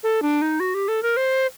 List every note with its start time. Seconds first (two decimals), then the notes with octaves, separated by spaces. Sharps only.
0.03 A4
0.22 D4
0.42 D#4
0.60 F#4
0.74 G4
0.88 A4
1.03 A#4
1.17 C5